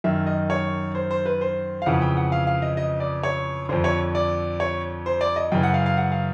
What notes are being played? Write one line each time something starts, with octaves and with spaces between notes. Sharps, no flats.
F#2 D#3 E5
D#5
C#5
C5
C5
B4
C5
F5
F2 C#3 E3 F#5
G5
F#5
F5
F5
D#5
D#5
D5
C#5
F2 D3 C5
C#5
D5
C#5
C5
D5
D#5
F#2 C#3 E3 G5
F#5
F5
F5
F#5
F5